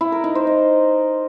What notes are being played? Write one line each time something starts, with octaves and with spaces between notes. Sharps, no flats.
E4
A#4
D#4
C5
D#5